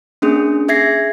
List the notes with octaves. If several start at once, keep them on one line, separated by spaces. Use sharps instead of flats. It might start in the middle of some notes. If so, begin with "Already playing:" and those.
A#3 C#4 D4 G#4
G#4 E5 G#6 A#6 C7